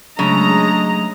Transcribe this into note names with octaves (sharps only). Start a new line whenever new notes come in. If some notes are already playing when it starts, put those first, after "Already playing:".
C#3 F#3 G#3 A3 C#4 D4 D#5 A#5